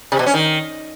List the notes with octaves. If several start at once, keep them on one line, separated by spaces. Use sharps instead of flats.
C3
B2
C#4
D#3